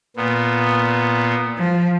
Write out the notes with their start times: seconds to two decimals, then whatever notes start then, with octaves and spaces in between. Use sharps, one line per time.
0.16 A#2 B3
1.57 F3